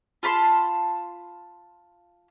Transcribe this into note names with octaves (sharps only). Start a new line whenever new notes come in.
F4 A5 B5 C6